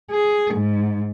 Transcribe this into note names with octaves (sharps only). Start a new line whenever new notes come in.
G#4
G#2